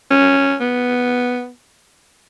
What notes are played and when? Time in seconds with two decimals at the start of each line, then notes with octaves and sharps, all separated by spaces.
0.11 C#4
0.61 B3